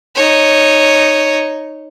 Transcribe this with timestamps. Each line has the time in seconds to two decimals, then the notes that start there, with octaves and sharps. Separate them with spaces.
0.16 D#4 C#5